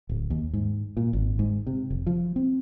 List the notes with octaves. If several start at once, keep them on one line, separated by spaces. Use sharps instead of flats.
D1
D#2
G#2
A#2
G#1
G#2
C3
F1
F3
C4